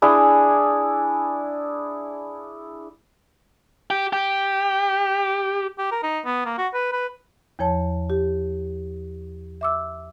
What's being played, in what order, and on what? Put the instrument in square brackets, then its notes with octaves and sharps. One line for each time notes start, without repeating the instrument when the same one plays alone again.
[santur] D4 E4 G#4
[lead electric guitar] G4
G4
[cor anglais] G4
A#4
D#4
B3
A#3
F#4
B4
B4
[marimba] E2 F3 C#5 A5
G4
E5 D6 E6